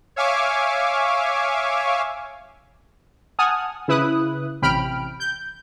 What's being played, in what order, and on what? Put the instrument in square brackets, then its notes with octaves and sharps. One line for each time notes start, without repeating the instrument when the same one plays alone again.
[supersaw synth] C#5 E5 F5 G#5 C#6 D6
[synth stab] F#5 G#5 A5 D#6 F6
C#3 E4 B4 D#6 F#6
A1 C3 G5 B5 F6 D7
G6